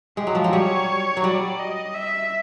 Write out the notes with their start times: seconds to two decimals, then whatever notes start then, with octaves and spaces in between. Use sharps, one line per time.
0.17 G#3 G4
0.27 F#3
0.35 F3
0.44 F#3
0.53 G3 C#5
1.17 F#3
1.24 G3 D5
1.59 D#5
1.95 E5